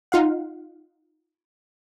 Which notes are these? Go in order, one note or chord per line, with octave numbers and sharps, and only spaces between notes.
D#4 F4 F5 F#5